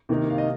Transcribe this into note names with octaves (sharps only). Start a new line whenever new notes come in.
C3 D#3 A#3 D#4
F5
D#5